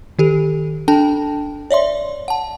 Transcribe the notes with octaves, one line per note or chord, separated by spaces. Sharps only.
D#3 G4 A4
D4 A4 G5 A5
C#5 D5 E5 C6
F#5 A5